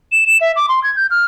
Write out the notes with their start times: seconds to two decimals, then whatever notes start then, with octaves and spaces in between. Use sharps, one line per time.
0.12 E7
0.27 E7
0.41 E5
0.56 D6
0.69 C6
0.84 G#6
0.96 G6
1.11 F6